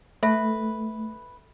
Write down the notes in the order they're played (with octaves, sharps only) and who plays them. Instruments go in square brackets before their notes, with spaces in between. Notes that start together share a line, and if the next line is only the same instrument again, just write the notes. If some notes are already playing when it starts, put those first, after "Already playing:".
[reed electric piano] A3 [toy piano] A4 E5 [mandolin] B4